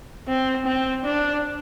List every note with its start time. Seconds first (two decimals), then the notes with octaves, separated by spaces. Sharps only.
0.28 C4
0.66 C4
1.05 D4